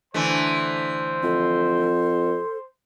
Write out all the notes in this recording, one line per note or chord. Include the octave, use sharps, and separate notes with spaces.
D3 E3 A3 C5 C6
F2 A4